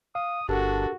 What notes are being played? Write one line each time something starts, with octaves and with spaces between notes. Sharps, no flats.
F5 D#6
G1 D4 F#4 G4 A4 A#4